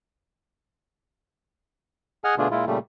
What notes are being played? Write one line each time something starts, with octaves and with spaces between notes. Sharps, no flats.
G#4 D#5 F#5 G#5 F6
B2 D3 A3 D4 F4 G#4
A#2 G#3 E4 F4
A#2 C#3 G3 A3